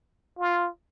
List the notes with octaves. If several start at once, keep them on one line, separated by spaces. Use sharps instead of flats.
F4